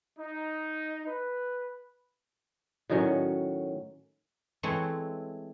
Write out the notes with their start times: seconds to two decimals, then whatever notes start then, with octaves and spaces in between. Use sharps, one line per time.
0.19 D#4
1.07 B4
2.89 A2 D#3 F#3 C#4
4.63 E3 G#3 A3 C4 E4 C#5